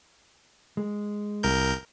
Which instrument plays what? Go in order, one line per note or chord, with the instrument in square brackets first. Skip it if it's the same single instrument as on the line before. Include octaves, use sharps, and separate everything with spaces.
[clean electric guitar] G#3
[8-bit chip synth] C2 A#4 G6